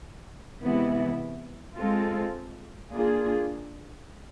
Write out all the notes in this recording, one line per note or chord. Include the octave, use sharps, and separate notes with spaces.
C3 E3 G#3 B3 E4
G#3 C4 F4 A4
A#3 D4 F4 G#4